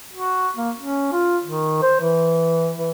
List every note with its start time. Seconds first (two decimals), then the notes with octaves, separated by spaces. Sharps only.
0.14 F#4
0.56 A#3
0.79 C#4
1.12 F4
1.44 D#3
1.82 C5
2.01 E3
2.78 E3